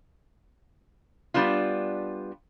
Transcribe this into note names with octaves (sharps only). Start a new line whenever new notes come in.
G3 B3 D4 F4